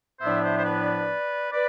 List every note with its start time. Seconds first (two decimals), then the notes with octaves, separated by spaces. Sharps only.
0.21 A2 F3 B3 D4 C5 E5
0.43 C5 E5
0.57 C5
0.64 B4 D5
1.52 B4 D5